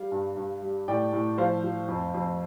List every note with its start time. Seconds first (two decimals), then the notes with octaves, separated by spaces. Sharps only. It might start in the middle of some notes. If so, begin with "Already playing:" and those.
Already playing: G3 F5
0.12 G2
0.37 G2
0.62 G3
0.88 A2 D5 G5
1.13 A2
1.38 F3 C5 F5
1.64 F3
1.88 F2
2.14 F2